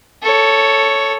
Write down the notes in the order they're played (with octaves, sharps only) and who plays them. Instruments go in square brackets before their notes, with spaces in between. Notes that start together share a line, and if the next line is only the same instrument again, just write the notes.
[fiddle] A4 C#5